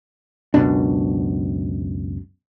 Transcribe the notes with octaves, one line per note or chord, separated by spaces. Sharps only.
C#2 F#2 B2 D4